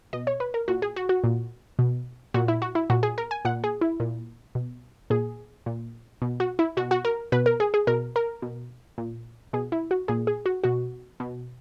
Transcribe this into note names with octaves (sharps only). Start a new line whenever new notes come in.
B2 D#5
C#5
B4
A#4
A#2 F#4
G#4
F#4
F#4
A#2
B2
A#2 F#4
E4
F#4
E4
A#2 F#4
G#4
A#4
G#5
A#2 F#5
G#4
E4
A#2
B2
A#2 G#4
A#2
B2
F#4
E4
B2 F#4
F#4
A#4
B2 B4
A#4
G#4
G#4
B2 A#4
A#4
B2
A#2
B2 G#4
E4
F#4
A#2 G#4
G#4
F#4
B2 F#4
B2